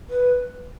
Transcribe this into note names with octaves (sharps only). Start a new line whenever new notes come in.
B4